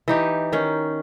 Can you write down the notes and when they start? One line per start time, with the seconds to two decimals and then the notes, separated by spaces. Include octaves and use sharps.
0.08 E3 D#4 G4
0.52 D#3 C#4